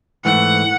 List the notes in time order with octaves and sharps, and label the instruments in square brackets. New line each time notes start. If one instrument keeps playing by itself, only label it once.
[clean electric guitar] G#2 E3 A3 [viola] F#5